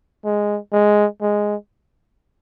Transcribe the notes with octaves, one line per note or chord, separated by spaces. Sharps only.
G#3
G#3
G#3